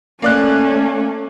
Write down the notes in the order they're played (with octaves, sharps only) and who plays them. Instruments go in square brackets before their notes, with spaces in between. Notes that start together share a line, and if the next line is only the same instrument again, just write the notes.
[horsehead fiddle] A3 C#4 [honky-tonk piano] A#3 D5 F#6